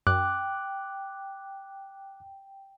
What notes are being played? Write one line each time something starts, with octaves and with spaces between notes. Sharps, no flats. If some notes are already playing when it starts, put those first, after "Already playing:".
F#2 G5 D6 F#6